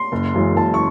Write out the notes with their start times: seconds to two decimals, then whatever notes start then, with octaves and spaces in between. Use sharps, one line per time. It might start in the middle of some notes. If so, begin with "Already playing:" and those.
Already playing: C6
0.12 F#1
0.34 F#2 C#3 E3 G#3
0.56 F#1 A5
0.74 C#6